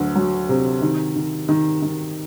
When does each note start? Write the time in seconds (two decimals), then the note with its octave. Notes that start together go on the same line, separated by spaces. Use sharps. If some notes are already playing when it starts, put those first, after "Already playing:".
Already playing: D2 F#3
0.16 F#3
0.49 C3
0.82 D#3
1.16 D#3
1.49 D#3
1.82 D#3